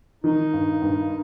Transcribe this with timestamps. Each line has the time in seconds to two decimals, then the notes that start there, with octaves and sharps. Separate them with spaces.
0.24 D#3 D#4
0.54 G2
0.82 G2